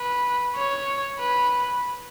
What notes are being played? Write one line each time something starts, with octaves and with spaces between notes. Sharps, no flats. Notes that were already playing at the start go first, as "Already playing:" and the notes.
Already playing: B4
C#5
B4